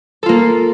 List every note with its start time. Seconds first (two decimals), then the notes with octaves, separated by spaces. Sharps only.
0.23 A4
0.26 F4
0.29 A#3